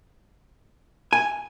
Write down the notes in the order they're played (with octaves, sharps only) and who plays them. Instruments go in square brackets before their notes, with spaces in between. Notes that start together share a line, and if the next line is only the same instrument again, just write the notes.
[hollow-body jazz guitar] G#5